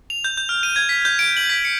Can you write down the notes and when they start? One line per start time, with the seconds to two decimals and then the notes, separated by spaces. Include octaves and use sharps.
0.10 F7
0.24 G6
0.37 G6
0.49 F6
0.63 D#7
0.76 G#6
0.89 B6
1.05 G6
1.19 D7
1.37 F#7
1.50 B6
1.65 C#7